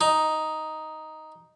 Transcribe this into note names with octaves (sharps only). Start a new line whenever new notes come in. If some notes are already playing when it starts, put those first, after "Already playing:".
D#4